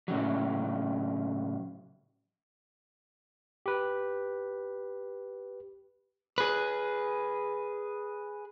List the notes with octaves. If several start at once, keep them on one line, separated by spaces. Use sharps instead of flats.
A2 C#3 F#3
G4 B4
G#4 B4